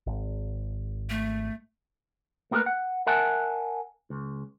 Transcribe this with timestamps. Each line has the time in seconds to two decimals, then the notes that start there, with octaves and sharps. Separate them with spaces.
0.07 G#1
1.10 A3
2.51 A3 A#3 F4 G4 A#4 B4
2.66 F#5
3.07 A#4 E5 F#5 G#5 A5
4.10 C#2